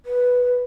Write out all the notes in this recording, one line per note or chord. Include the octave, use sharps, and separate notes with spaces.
B4